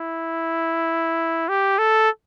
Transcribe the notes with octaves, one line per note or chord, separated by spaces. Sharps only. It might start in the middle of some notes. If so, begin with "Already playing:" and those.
Already playing: E4
G4
A4